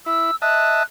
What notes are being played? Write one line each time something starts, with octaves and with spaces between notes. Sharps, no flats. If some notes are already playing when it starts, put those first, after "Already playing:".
E4 E6
D#5 E5 A5 F#6